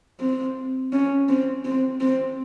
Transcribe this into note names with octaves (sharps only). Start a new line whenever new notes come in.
C4
C#4
C4
C4
C4